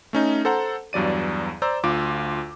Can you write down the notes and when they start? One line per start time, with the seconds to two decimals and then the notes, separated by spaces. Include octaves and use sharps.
0.13 A3 C#4 D#4
0.45 A4 C5 F#5 A#5
0.93 E2 G2 F#3 D5 D#7
1.62 C5 D5 A#5 E6
1.84 D2 F4 D6